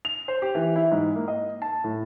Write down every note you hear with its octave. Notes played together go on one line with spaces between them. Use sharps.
F7
C5
G4
E3
E4
G#2
A#3
D#5
A5
A2